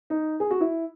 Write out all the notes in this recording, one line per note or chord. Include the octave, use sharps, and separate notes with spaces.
D#4
G#4
F#4
E4